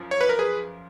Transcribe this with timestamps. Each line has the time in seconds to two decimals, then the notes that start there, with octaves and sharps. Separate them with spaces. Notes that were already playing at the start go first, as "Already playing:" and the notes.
Already playing: F#2 F3
0.11 C#5
0.21 B4
0.29 A#4
0.39 G#4 B4